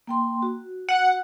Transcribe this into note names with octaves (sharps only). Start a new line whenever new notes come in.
A#3 G5 C6
F#4
F#5